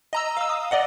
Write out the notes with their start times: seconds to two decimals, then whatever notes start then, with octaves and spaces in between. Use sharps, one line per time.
0.13 D#5 A#5 E6
0.37 F5 E6
0.49 D#6
0.71 D5 D#5 F#5